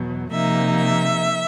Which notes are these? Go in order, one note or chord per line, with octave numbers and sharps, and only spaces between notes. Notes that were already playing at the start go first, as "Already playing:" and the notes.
Already playing: E2 B2 F#3
C3 F3 A#3 D#4 E5
E5